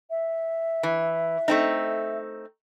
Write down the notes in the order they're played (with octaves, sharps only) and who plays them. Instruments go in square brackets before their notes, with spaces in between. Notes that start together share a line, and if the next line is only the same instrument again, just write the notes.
[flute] E5
[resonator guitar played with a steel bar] E3
A3 C4 D#4